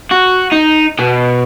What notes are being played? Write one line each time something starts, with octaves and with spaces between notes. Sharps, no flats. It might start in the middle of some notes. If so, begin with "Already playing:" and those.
F#4
D#4
B2